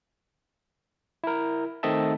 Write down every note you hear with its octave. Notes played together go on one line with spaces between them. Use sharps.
E4 A#4
D#3 A3 C4 D#5 E5 A5